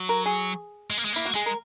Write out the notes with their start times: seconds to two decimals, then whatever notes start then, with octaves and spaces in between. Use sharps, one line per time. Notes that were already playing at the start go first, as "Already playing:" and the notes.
Already playing: F#3
0.09 A#4
0.26 G#4
0.90 G#3
0.97 A#3
1.05 G#3
1.13 A#3 E4
1.25 F#4
1.34 G#3 G#4
1.46 A#4